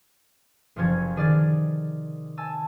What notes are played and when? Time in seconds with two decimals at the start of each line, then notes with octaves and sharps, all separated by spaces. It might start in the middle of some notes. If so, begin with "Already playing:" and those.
0.76 F#1 F#2 C3 F3 C#4 G#6
1.16 D#3 G#4 D5 F6 A6
2.37 G#5 A5 E6